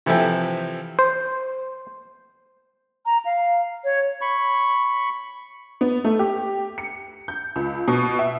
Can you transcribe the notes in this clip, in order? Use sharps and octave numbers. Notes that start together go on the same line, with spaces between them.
C3 E3 F3 A4 E5 G5
C5
A#5
F5
C#5
B5 C#6
B3
A3
G4
C#7
G6
C#2
B2
E5